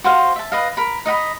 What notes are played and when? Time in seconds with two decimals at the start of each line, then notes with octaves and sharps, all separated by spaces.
0.04 F#4 C5 F5
0.36 E5 A5
0.52 B4 D#5 F5
0.77 A#4 B5
1.05 D#4 D#5 F#5 B5